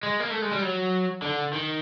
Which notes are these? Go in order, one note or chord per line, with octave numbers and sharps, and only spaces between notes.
G#3
A#3
A3
G#3
G3
F#3
D3
D#3